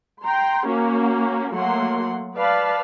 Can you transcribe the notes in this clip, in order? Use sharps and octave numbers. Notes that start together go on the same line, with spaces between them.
G5 A#5 C6
A#3 C#4 F#4
F#3 A3 A#3 F#5 C6
B4 D5 F5 A5 B5